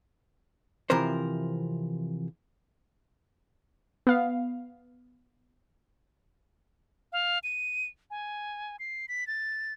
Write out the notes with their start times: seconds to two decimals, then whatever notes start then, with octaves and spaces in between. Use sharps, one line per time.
0.90 C3 E3 F3 A#4 C5
4.07 B3 F5
7.13 F5
7.44 D#7
8.11 G#5
8.80 C7
9.09 B6
9.27 A6